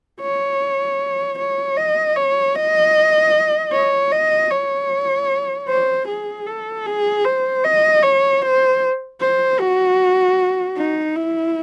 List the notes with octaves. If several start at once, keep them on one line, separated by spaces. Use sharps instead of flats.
C#5
C#5
D#5
C#5
D#5
C#5
D#5
C#5
C5
G#4
A4
G#4
C5
D#5
C#5
C5
C5
F#4
D#4
E4